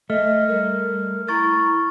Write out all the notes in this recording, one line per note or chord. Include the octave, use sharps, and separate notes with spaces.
A3 D#5 F6
G3 A#4
E4 A#5 C#6 A6